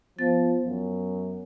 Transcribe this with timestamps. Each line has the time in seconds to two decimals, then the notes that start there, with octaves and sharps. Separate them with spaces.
0.19 F3 B3 A6
0.64 F#2